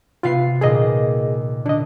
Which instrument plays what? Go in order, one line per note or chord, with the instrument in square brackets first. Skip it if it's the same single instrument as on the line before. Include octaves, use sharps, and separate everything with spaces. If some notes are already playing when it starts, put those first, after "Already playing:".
[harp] C3 B3 C7 [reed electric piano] F4 F5
[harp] D#2 A#2 [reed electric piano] G#4 D#5
[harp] D3 [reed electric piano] D4 D#5